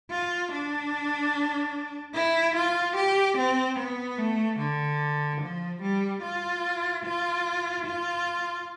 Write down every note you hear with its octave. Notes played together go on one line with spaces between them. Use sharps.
F4
D4
E4
F4
G4
C4
B3
A3
D3
F3
G3
F4
F4
F4